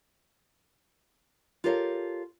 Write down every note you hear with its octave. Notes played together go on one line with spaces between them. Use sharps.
F4 G4 A4 A#4 C#5 F5